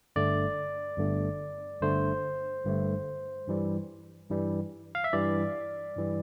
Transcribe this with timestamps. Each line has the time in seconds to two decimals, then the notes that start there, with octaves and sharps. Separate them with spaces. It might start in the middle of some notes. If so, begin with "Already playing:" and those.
0.16 G1 G2 D3 A3 D5
0.98 G1 G2 D3 A3
1.81 G1 G2 D3 A3 C5
2.65 G1 G2 D3 A3
3.47 G2 E3 G3
4.30 G2 E3 G3
4.95 F5
5.04 E5
5.13 G2 E3 G3 D5
5.96 G2 E3 G3